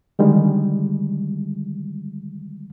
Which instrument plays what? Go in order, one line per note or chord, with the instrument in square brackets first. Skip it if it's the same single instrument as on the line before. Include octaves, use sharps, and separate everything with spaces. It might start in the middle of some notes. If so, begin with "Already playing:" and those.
[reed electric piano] D3 D#3 G3 G#3